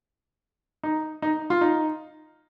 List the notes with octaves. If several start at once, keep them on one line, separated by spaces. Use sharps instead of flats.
D#4
D#4
F4
D#4